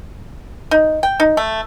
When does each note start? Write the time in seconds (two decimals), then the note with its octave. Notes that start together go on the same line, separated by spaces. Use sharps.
0.71 D#4
1.03 G5
1.20 D#4
1.37 A3